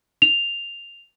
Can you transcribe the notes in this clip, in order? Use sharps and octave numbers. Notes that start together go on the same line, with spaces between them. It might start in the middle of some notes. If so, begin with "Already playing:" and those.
F7